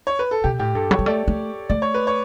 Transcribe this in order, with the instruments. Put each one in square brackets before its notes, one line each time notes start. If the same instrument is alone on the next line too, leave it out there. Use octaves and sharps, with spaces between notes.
[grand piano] C#5
B4
A4
[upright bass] B2 [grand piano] G4
[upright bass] A2 [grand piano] G4
[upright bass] G2 [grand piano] A4
[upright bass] F#3 [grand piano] C#5
[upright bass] G3
[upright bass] A3 [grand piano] D5
[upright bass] A3
[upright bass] A3 [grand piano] D5
[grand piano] C#5
B4
C#5